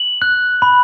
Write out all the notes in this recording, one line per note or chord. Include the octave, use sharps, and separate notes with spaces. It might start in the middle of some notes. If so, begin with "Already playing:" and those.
Already playing: F#7
F#6
B5